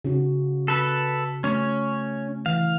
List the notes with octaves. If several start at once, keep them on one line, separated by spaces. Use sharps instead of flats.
C#3 C#4 F#4
A4 B4
A3 C#4 C#5
E3 F5